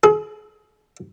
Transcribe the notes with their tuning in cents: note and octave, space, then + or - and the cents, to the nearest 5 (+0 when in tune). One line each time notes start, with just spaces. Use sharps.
G#4 +40